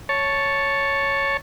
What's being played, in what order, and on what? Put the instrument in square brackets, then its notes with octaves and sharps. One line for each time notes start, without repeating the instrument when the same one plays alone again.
[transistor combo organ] C#5 A5